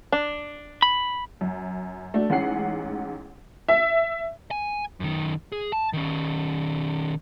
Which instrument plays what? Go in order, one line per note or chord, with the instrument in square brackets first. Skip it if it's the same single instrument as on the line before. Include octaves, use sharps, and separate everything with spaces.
[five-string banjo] D4
[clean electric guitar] B5
[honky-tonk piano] F#2
A3 D4 F#4
A1 G#2 C#4 F#5 C7
E5
[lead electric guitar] G#5
F#2 D#3
G#4
A5
D#3 C#4